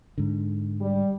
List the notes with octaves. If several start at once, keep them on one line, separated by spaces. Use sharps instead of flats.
G#2 D3
G3